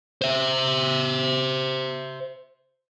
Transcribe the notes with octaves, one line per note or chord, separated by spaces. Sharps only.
C5 E5